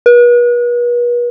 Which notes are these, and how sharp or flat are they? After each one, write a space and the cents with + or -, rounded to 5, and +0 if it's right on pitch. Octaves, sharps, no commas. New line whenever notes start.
B4 -40